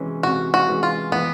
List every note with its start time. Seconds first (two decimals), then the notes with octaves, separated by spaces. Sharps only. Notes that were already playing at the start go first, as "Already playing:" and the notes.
Already playing: C3 E3 G#3 C#4
0.23 C3 F#4
0.54 F#4
0.68 E3 G#3 C#4
0.83 F4
1.12 E3 B3